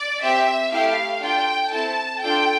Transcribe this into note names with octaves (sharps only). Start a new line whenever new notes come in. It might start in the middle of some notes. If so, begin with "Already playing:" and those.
Already playing: D5
C4 G4 E5
A3 E4 G4 F5
D4 F4 A4 G5
C4 E4 A4 A5
D4 F4 A4 G5